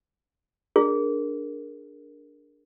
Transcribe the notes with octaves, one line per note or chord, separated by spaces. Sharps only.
D4 G#4 A#4